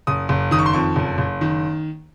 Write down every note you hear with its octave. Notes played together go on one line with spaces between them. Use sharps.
F#1 D#6
F#1
D#3 D#6
C#6
C6
F2 C#6
F#1
F#1
D#3